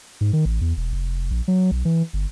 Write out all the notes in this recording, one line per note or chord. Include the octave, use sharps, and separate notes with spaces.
G#2
D#3
A1
E2
E1
F1
A#1
F#3
B1
E3
G1